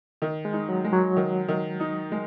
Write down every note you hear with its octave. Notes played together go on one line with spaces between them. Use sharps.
D#3
G#3
D#4
F#3
G#3
F#3
D#3
D#3
D#4
G#3